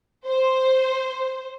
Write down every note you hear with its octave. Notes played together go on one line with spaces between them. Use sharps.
C5